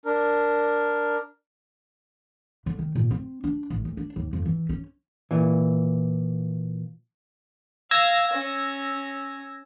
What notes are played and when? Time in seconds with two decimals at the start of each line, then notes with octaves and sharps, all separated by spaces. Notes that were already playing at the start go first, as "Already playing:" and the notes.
0.06 D4 A#4
2.66 D3
2.79 D#3
2.95 A#2
3.11 C4
3.44 D4
3.70 A1
3.85 D2
3.97 D4
4.16 D#2
4.33 F2
4.46 E3
4.69 C#4
5.31 A#2 E3
7.91 F5 E6 G#6 A#6
8.33 C#4